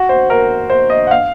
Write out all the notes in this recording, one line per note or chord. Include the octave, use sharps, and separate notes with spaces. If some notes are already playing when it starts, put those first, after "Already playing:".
Already playing: F#4
C5
A#4
C5
D#5
F#5
F5